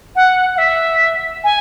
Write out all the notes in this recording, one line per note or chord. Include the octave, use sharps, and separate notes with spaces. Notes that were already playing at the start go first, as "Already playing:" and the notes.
F#5
F#5
E5
G#5